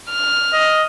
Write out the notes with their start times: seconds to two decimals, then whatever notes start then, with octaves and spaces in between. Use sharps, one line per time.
0.10 F6
0.53 D#5